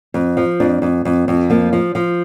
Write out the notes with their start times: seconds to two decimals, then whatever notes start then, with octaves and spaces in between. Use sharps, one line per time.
0.14 F2
0.37 F3
0.60 F2 D4
0.82 F2
1.05 F2
1.28 F2
1.50 F3 A#3
1.73 F3
1.95 F3